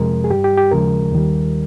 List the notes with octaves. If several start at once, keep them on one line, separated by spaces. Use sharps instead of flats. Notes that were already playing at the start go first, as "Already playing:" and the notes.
Already playing: F2 C3 F3 G#3 A#4
G#4
G2 G3 G4
G4
G4
D#2 C#3 F3 G#3 A#4
D#2 D#3 G3